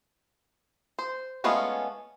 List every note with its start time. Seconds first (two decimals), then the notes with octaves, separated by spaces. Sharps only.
0.99 C5
1.44 G#3 A3 B3 C#4 F4